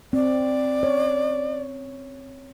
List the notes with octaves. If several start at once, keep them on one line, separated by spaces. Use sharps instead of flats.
C4 D5
C#5